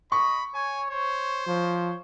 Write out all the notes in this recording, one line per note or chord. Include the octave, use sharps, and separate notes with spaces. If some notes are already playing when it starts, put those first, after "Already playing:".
D#5 B5 C#6
C#5 G#5
C5 C#5
F3 C#5